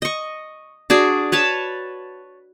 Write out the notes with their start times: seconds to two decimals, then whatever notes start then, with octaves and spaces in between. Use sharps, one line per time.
0.02 D#5 C#6
0.90 D4 F#4 G#4
1.32 B4 C#5 A5 B5